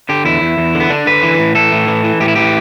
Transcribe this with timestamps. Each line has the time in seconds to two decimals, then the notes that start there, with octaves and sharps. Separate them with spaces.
0.09 D3 G4
0.25 E2 E4
0.41 E2
0.58 E2
0.75 D3
0.80 B3
0.90 D3 D4
1.07 D3 B4
1.23 E3
1.39 A2
1.55 E3 A4
1.72 A2
1.88 E3
2.04 E3
2.20 A2 G4
2.28 E4
2.35 E3 G4